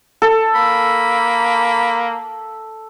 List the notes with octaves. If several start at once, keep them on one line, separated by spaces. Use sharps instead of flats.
A4
A#3 B5